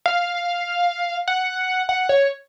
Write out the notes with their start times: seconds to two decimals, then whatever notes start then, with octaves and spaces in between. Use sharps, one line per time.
0.06 F5
1.28 F#5
1.89 F#5
2.09 C#5